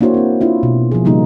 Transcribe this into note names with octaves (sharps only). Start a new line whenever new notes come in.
A#3 D4 E4 F#4 C5 C#5
C4 E4
D4 E4 F4
B2
F3 G#4
C#3 G3 A#3 D#4